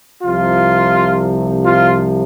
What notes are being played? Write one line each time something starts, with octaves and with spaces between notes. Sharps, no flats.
C2 C3 F3 F4
F4